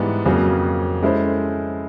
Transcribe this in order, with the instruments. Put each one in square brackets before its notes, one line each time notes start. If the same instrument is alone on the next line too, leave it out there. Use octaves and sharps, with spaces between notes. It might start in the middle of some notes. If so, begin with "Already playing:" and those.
Already playing: [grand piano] G#2 E3 G3 B3
F2 C#3 F#3 A#3
G#3 C#4 E4 A4 C5